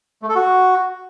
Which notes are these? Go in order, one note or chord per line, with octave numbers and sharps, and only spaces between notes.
A3
A4
F#4